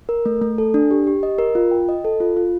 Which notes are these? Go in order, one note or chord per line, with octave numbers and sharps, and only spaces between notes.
A#4
A3
A3
A4
D4
G4
G4
D#5
A#4
F4
G5
D#5
A4
F4
F4